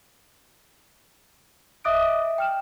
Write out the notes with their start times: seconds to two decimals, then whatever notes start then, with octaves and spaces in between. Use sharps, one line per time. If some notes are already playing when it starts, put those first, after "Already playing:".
1.84 D#5 E5 D6 D#6 F#6 D7
2.21 E5
2.38 G5 F6 E7